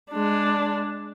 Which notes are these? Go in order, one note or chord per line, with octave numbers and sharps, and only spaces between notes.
G#3 D4